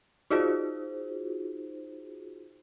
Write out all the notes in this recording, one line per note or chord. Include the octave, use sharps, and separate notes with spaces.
D#4 F4 F#4 G#4 C5